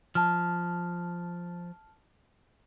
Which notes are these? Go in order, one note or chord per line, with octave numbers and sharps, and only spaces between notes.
F3 A5 F6